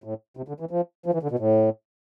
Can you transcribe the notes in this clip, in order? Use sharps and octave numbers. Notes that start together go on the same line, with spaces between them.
A2
C3
D3
E3
F3
F3
E3
D3
B2
A2